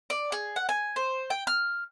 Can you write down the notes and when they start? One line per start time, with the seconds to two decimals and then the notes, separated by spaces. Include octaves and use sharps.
0.10 D5
0.32 G#4
0.56 F#5
0.69 G#5
0.96 C5
1.30 G5
1.47 F6